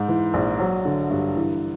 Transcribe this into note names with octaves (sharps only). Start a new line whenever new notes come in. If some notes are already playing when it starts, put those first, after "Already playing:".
Already playing: G#2
E3
A#1
F#3
D3
G2
E3